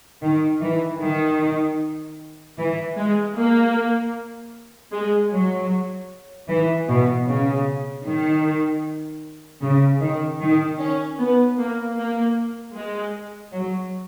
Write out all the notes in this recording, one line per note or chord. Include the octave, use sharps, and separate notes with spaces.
D#3
E3
D#3
E3
G#3
A#3
G#3
F#3
E3
B2
C#3
D#3
C#3
D#3
D#3
C#4
B3
A#3
A#3
G#3
F#3